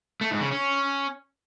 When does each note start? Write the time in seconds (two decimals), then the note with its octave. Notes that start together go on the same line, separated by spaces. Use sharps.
0.21 A3
0.31 G#2
0.41 C#3
0.52 C#4